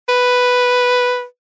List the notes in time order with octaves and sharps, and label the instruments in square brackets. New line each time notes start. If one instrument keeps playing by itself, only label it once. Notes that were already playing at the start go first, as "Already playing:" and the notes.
[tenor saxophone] B4